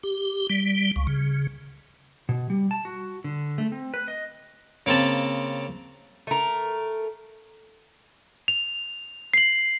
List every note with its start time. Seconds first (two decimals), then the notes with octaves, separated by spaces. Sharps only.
0.03 G4
0.50 G3
0.96 C#2
1.07 C#3
2.29 B2
2.50 G3
2.71 A5
2.85 F#4
3.24 D3
3.58 A3
3.72 C4
3.94 B4
4.08 D#5
4.86 C#3 A#3 C4 A5 B5
6.27 A3 A#4
8.48 F7
9.34 C7 F#7